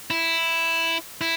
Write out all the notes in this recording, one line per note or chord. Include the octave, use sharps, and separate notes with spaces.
E4
E4